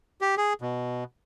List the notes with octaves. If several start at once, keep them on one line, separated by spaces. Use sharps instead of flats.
G4
G#4
B2